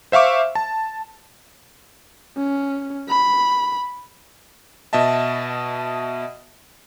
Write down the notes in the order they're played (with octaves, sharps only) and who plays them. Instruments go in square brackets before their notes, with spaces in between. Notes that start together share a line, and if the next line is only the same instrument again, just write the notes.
[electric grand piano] C5 E5 F5 C#6 D6
A5
[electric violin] C#4
B5
[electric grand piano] B2 D#5 E5 A5